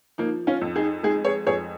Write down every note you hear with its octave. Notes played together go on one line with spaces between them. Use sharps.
F3 A#3 D#4
C#4 F4
F2
D#4 G#4
G#3 D#4 G#4
G#4 C#5
F2 G#4 C#5